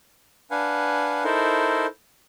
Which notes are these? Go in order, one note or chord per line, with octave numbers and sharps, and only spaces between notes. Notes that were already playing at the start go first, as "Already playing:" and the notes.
D4 B4 F5 F#5 G#5
D#4 E4 A4 A#4 C5